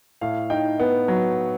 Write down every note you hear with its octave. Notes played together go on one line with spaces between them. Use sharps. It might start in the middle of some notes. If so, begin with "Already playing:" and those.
A2 F5
D#4 G5
B3
F#3